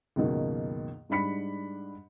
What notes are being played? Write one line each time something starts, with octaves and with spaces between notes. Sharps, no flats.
C#2 F#2 B2 D#3 A#3
G#2 G3 D4 B5 B6 C#7